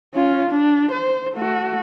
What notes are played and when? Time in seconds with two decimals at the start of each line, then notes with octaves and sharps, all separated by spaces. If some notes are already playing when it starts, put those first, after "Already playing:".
0.14 C#4 F4
0.50 D4
0.91 C5
1.34 A3 F#4